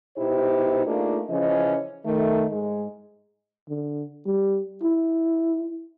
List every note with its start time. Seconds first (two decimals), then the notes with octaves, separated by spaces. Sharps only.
0.16 B2 D#4 E4 G4 C5
0.85 A3 A#3 D4 D#4 F4 G#4
1.29 C#3 E3 F3 C#4 D#5
2.05 D#3 A3
2.51 G#2 G#3 D#4
3.69 D3
4.26 G3
4.83 E4